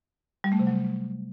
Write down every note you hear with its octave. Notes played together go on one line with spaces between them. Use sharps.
G3
A3
C3
F#3